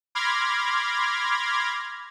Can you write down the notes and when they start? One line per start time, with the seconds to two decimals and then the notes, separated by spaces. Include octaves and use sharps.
0.15 B5 C6 D6 F6 G#6 A#6